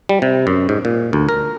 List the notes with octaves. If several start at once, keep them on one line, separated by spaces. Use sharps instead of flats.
G3
C3
F#2
G#2
A#2
D2
A#4